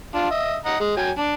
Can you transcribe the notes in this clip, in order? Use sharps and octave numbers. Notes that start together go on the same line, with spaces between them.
D4 F4
D#5 E5
D#5 F#5 A#5
G#3
F#3 G5 G#5
D4